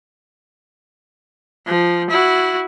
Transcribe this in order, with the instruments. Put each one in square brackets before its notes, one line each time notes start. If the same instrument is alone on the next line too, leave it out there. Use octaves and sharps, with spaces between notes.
[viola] F3
E4 F#4